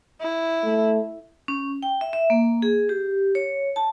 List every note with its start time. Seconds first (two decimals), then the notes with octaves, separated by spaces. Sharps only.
0.22 E4
0.64 A3
1.48 C#4
1.83 G5
2.01 E5
2.13 E5
2.30 A#3
2.62 G#4
2.89 G4
3.35 C#5
3.76 A5